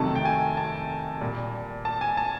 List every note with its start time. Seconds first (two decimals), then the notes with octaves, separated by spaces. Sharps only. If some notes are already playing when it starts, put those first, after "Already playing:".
Already playing: F2 C3 D#3 F#3 A3 A5
0.15 G5
0.25 G#5
0.57 A5
1.21 A#2 G3
1.85 A5
2.01 G#5
2.17 A5